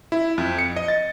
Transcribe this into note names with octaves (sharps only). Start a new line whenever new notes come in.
E4
F2
C#7
D#5
A6